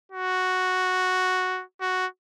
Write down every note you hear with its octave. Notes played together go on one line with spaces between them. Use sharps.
F#4
F#4